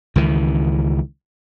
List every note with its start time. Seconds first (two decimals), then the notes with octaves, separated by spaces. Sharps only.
0.16 C#2 D#3 E3